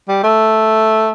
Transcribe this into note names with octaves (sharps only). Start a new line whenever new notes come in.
G3
A3